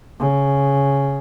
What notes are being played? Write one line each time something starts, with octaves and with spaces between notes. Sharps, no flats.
C#3